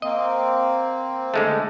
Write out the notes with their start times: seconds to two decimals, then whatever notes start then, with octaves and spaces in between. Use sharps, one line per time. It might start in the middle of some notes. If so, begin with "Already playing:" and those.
0.02 A#3 C4 D#5
1.34 D3 G#3 A3